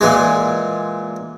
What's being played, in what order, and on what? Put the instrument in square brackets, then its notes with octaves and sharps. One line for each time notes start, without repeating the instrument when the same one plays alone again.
[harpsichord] A#2 E3 G#3